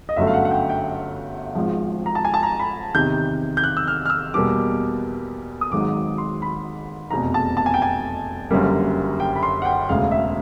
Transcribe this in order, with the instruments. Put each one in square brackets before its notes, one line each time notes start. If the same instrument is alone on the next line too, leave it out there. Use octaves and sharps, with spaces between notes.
[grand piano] D#5
G1 F#2 D3 F#3 A3 E5
F5
F#5
F#5
G5
G5
G#1 G#2 F3
A#5
A5
G#5
A5
A#5
B5
E2 C3 D#3 G6
G6
F#6
E6
F6
F6
E6
E2 B2 G3 A#3 D6
D#6
G#1 G#2 D#3 F#3 D6
C6
B5
F1 E2 B2 A#5
A5
A5
G#5
G5
G#5
F#1 F#2 D3 G3 A#3
G5
B5
C6
F#5
G5
E1 D2 C#3 F5
E5